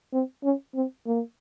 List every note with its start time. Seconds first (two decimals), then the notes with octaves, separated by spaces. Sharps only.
0.13 C4
0.44 C#4
0.75 C4
1.06 A#3